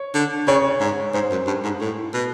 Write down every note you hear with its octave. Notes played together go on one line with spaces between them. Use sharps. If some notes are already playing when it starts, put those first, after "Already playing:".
Already playing: C#5
D3
C#3 C#5
G#2
G#2 C5
F#2
G2
G#2
A2
B2